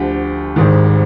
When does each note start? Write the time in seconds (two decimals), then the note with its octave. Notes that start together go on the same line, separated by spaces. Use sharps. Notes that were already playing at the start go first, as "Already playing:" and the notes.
Already playing: D2 D3 F3 G4
0.56 G#1 G#2 D#3